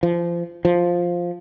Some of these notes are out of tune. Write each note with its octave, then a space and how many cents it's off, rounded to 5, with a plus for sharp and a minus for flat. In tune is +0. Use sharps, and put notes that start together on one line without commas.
F3 -25
F3 +5